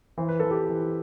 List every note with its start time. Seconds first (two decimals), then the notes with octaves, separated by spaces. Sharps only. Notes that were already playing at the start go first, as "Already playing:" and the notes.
0.18 E3 C5
0.29 B4
0.40 E3 A4
0.51 G4 B4
0.69 E3